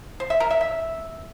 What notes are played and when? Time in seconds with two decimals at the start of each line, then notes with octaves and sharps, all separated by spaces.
0.20 C5
0.30 E5
0.40 A#4
0.51 E5
0.61 E5